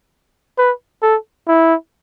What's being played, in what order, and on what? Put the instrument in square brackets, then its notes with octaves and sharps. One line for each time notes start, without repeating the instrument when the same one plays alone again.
[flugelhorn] B4
A4
E4